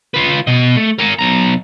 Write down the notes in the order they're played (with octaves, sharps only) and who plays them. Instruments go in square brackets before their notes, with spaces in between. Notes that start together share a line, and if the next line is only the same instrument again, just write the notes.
[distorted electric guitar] F4 B4
B2 D#5
A3
A#4 G#5
B1 A#5